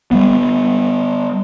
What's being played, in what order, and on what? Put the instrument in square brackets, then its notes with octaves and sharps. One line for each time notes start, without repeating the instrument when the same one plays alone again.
[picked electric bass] G3 A#3 B3